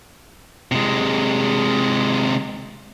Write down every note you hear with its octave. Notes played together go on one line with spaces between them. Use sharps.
C3 G#3